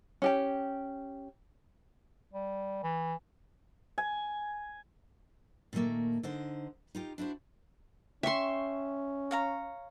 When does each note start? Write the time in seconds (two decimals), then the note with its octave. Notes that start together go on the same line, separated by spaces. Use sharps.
0.22 C#4 G4 G5
2.33 G3
2.83 E3
3.98 G#5
5.73 A#2 D#3 F3 A3 A#3
6.23 D3 D#4 C5
6.95 D#4 F4 G4
7.18 D4 E4 F#4 C5
8.23 C#4 E5 G5 C6 C#6
9.31 C#5 F5 A#5